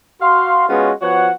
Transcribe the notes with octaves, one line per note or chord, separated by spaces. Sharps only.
F#4 F5 C6
G#3 B3 C#4 F4 F#4 C#5
F3 B3 F#4 C#5 F#5